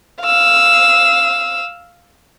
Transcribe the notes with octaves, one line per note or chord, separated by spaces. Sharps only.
F5 E6